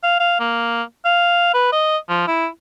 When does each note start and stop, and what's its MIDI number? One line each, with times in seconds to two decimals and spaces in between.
0.03 0.19 77
0.20 0.36 77
0.40 0.82 58
1.05 1.49 77
1.54 1.68 71
1.72 1.97 75
2.09 2.23 53
2.28 2.47 64